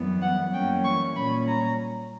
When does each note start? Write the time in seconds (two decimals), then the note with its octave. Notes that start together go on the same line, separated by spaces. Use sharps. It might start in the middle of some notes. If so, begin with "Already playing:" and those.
Already playing: F#2 E3 G3 B3
0.21 F#5
0.52 F#2 E3 G3 A#3 C#4 G5
0.83 C#6
1.15 A#2 G3 C#4 B5
1.47 A#5